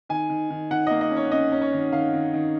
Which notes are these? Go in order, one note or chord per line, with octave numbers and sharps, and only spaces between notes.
D#3 G#5
D#3
D#3
D#3 F#5
A#3 D#5
D#5
C#4
C#5
C#4 D#5
C#4
C#5
D#3
D#3 F5
D#3
D#3